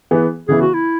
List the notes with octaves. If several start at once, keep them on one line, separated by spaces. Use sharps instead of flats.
E3 B3 G#4
C#3 E3 B3 E4 G#4
F#4
E4